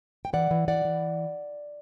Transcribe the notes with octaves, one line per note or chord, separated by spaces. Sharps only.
G5
E3 D5 F#5
E3
E3 D5 F#5
E3